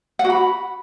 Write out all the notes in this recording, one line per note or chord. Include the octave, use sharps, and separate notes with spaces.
F#5
F#4
B5